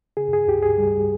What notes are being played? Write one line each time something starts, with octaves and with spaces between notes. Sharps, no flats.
C#3 G#4
G#4
C#2 G4
G#4
G3